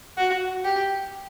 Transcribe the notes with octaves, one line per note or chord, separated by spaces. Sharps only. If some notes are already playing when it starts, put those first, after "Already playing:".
F#4
G4